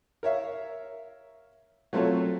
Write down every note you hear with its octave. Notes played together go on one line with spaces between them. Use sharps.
A#4 C#5 E5 F5
F#3 A3 C4 F4 A4 C#5